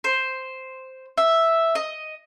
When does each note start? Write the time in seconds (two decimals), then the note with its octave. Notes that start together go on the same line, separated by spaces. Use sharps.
0.04 C5
1.18 E5
1.75 D#5